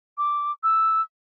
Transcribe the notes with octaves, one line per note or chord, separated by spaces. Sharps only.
D6
E6